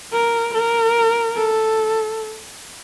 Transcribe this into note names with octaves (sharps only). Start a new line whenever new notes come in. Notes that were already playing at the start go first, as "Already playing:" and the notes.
A#4
A#4
A4